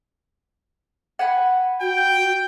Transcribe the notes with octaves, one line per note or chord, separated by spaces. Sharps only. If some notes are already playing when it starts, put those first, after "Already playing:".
F#5 G#5 B5
F#4 G5